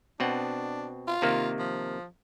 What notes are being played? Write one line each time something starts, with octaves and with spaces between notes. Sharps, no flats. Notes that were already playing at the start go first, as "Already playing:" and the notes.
B2 C4 D4 F#5
F4
C3 D#3 A#3
F3